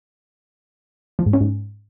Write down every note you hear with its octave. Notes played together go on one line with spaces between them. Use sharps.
F3
G#2
C#4
G#2